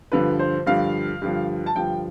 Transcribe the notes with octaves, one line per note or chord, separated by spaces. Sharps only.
G2 D3 F3 B4
C5
G2 D3 F3 F5
G2 D3 F3
A5
G2 D3 F3 G5